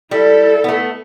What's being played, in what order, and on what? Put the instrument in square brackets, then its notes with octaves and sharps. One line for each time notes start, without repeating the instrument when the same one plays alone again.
[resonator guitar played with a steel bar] G3 [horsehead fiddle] E4 A4
[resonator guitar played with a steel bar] A3 B3